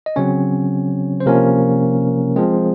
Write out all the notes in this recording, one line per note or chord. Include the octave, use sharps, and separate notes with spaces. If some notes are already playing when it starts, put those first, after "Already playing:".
D#5
C#3 F#3 C4 C#4 C#5
C5
C3 F3 A#3 C#4 A#4
F3 G#3 C4 G#4